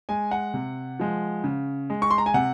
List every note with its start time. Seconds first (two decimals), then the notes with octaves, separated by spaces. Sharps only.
0.09 G#3 G#5
0.31 F#5
0.54 C3
0.99 F3 G#3
1.44 C#3
1.90 G#3
2.02 C#6
2.11 C6
2.18 A#5
2.26 G#5
2.34 C3 F#5